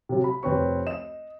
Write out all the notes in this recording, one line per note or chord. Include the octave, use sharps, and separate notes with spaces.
C3 F#3
B5
F1 C4 B4 C#5 C#6
D#5 E7